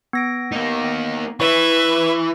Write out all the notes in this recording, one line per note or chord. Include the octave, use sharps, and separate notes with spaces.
B3 A#6 D7
A#3 D#4
E3 B4 E5 C#6